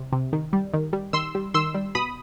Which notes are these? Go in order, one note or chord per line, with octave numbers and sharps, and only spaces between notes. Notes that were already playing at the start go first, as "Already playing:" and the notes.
Already playing: C3
C3
D#3
G3
D#3
G3
D#3 C6 E6
G3
D#3 C6 E6
G3
B2 B5 D#6